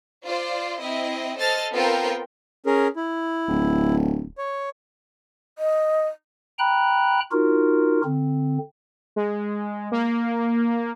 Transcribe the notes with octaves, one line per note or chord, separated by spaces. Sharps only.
F4 C5 D5
C4 E4 D#5
A4 C5 D#5 F6 A6
B3 C4 F4 A4 A#4 G5
C#4 G#4 A#4
E4
D1
C#5
D#5
G5 A#5 B5 F#6
D#4 F4 F#4 A#4
D3 C4
G#3
A#3